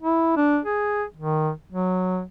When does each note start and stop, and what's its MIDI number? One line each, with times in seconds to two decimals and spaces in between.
0.02 0.33 64
0.37 0.58 62
0.65 1.03 68
1.17 1.51 51
1.72 2.22 54